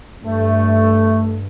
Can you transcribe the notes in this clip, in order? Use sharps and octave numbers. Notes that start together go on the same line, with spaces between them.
G2 A3